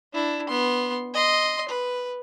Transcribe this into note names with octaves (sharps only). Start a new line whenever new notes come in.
D4 E4
B3 C6
D#5 C6
B4